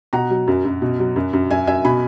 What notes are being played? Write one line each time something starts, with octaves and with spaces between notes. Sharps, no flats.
B2 F#5 A#5
F#3
F#2
F#2
B2
F#3
F#2
F#2
F#2 E5 G#5
F#2 E5 G#5
B2 G#5 B5